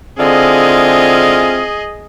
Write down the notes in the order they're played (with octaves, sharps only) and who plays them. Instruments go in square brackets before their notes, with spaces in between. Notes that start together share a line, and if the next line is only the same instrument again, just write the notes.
[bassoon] D3 [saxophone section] G#3 E4 F4 [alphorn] C4 [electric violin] G#4 D#5